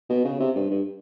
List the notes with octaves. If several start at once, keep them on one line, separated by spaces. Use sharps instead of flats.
B2
C#3
C3
G2
G2